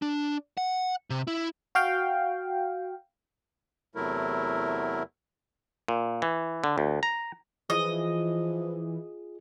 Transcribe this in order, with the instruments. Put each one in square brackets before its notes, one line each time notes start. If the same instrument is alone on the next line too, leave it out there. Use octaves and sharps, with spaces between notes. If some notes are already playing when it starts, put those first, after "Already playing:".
[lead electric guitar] D4
F#5
C3
E4
[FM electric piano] F#4 F5 G5
[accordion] E2 C3 F#3 A3 E4 A#4
[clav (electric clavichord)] A#2
E3
D3
D2
A#5
[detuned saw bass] E3 [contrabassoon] F3 [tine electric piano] F4 G#4 [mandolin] D#5